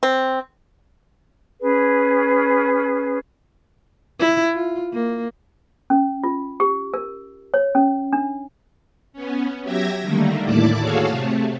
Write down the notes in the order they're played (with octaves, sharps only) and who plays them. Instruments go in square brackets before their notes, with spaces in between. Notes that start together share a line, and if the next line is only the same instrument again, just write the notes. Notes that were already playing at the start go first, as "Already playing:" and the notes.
[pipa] C4
[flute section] C#4 G#4 B4
[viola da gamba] E4
F4
A#3
[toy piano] C#4
F4
G4
A#4
C#5
C#4
D4
[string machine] B3 C#4
F#3 G4 E5 G#6 A#6
D3 D#3 G3 A3 A#3
D#2 A2 E4 D5 A5 D6
F#4 G#4 A4 C#5 F5
C3 A3